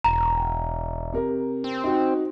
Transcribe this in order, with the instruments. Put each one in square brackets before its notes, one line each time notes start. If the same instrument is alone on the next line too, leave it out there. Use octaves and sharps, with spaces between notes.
[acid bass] E1 [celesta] A#5
[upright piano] C3 A#4
[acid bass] C4
[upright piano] D#4 F#4